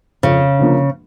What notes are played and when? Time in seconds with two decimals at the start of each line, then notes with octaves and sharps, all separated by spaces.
0.23 F2 C#3
0.59 D3 F3 A#3